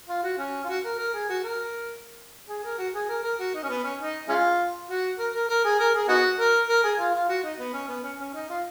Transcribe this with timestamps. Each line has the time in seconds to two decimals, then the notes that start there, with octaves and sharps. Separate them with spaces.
0.09 F4
0.23 F#4
0.38 C#4
0.64 F4
0.69 F#4
0.84 A#4
0.98 A#4
1.14 G#4
1.29 F#4
1.43 A#4
2.49 G#4
2.64 A#4
2.78 F#4
2.94 G#4
3.09 A#4
3.23 A#4
3.39 F#4
3.54 D#4
3.63 C#4
3.69 B3
3.84 C#4
3.99 D#4
4.28 G#3 C#4 F4
4.89 F#4
5.19 A#4
5.34 A#4
5.49 A#4
5.64 G#4
5.79 A#4
5.94 G#4
6.08 B3 D#4 F#4
6.39 A#4
6.68 A#4
6.83 G#4
6.99 F4
7.14 F4
7.29 F#4
7.44 D#4
7.59 B3
7.74 C#4
7.88 B3
8.04 C#4
8.19 C#4
8.34 D#4
8.49 F4